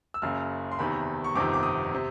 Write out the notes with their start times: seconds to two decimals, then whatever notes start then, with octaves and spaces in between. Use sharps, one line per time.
0.14 E6
0.22 F#1 F#2 C#3 F6
0.72 C6
0.79 E2 C3 D#3 B5
1.24 C#6
1.35 G1 F2 C3 D#3 D6
1.53 D6
1.63 D#6
1.94 C3